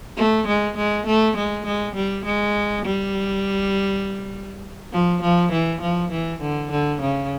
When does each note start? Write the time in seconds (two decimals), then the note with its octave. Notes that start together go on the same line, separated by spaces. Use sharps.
0.17 A3
0.47 G#3
0.77 G#3
1.06 A3
1.37 G#3
1.66 G#3
1.95 G3
2.25 G#3
2.85 G3
4.92 F3
5.22 F3
5.52 E3
5.81 F3
6.11 E3
6.41 D3
6.71 D3
7.01 C#3